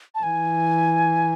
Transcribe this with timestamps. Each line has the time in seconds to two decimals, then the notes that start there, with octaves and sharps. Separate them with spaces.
0.15 A5
0.23 E3 G#5